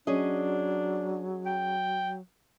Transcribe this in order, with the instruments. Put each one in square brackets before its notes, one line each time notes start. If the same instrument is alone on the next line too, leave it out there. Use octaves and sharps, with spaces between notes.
[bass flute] F#3 [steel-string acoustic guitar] C#4 G#4 D#5 [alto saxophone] D4
[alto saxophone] G5